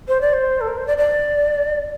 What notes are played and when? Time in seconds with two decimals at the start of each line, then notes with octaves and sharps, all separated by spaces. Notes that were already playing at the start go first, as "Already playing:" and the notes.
0.08 C5
0.21 D5
0.33 C5
0.61 A4
0.68 A#4
0.78 C5
0.87 D5
0.98 D5